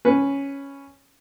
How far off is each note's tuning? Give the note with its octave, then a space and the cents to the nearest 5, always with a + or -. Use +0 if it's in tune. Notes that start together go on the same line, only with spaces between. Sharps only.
C#4 +0 B4 +0